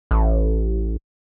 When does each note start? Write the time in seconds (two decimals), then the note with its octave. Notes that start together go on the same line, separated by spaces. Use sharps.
0.11 A1